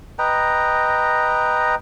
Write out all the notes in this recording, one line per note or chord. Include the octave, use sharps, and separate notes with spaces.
B4 D#5 G5 A#5